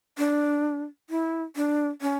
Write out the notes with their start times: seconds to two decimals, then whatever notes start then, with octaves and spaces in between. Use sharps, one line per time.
0.18 D4
1.10 E4
1.56 D4
2.01 C#4